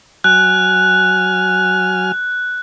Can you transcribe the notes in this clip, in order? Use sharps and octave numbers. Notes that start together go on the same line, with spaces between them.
F#3 G#5 F6 F#6